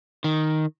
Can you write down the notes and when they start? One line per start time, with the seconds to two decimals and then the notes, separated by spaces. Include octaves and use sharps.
0.24 D#3